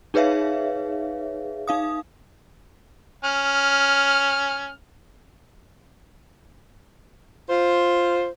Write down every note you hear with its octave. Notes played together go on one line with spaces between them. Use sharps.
D#4 G#4 B4 C#5 E5 F5
D#4 F5 D#6
C#4 F6
F4 C5